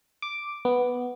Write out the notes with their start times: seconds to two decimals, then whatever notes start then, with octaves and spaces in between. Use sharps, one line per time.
0.22 D6
0.65 B3